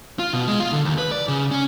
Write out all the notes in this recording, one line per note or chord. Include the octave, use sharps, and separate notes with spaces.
F4
B2
G#3
F4
D3
D#2
B4
D5
C#3
C#4